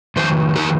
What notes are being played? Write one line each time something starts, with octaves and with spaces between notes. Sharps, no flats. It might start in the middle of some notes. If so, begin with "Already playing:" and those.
F2 D#3 C5
G4 A#4